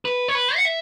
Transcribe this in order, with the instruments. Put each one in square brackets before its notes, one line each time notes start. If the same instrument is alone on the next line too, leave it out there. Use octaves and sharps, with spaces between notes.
[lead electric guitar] B4
C#5
B4
F#5
E5